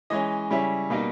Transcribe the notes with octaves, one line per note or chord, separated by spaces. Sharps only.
E3 G#3 C#4 D#5
C#3 G3 C#4 E4
B2 G3 A#3 D#4